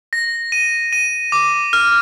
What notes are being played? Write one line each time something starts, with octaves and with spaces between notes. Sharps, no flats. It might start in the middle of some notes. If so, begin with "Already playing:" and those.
A#6
D#7
D#7
D6
F6